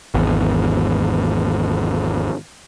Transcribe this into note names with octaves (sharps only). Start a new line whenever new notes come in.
G#1 E2